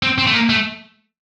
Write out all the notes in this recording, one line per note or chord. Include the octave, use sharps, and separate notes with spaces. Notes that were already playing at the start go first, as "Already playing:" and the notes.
C4
C4
A3
A#3
A3